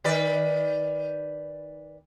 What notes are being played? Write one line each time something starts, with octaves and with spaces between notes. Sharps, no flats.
D#3 B4 D5